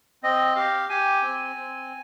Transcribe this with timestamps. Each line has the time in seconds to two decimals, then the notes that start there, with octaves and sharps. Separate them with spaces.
0.23 C4 D#5
0.56 G4 F5
0.89 G4 G#5
1.22 C4
1.56 C4